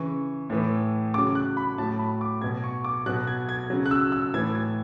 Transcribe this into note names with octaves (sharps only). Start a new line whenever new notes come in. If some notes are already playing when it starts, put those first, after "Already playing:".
Already playing: C#3 E3 C#6
A2 E3
C#3 F#3 D6
F#6
B5
A2 F#3 A5
B5
D6
B2 F#3 G#6
C#6
D6
B2 F#3 F#6
G#6
G#6
C#3 F#3
F#6
E6
E6
A2 E3 G#6
G#6